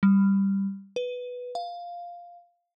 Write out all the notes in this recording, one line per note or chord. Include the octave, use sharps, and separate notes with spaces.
G3
B4
F5